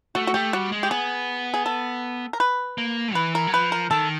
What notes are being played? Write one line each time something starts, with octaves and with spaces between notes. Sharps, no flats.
A3 F#4
F#4
A3 G4
G3 F#4
G#3
G4
B3 G#4
G#4
A4
A#4
B4
A#3
E3 B4
A#4
F#3
F3 B4
A#4
D#3 A4